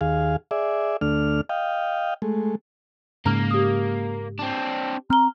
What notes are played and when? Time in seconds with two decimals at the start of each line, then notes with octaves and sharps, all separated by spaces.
0.01 D#2 G#4 F5
0.51 G#4 D5 E5
1.01 D2 A3 D4 F6
1.49 D#5 F5 G5
2.22 G#3 A3
3.26 G#2 C#3 A#3 A#5 F6
3.51 G4 D#6
4.39 C4 D4
5.10 C4 A#5 F6 G7